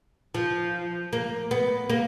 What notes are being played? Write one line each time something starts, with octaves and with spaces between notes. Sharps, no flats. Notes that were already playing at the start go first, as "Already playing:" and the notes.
F3
A#3
B3
A#3